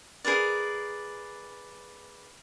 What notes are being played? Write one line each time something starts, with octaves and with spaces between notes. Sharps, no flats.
G#4 A#4 B4 D5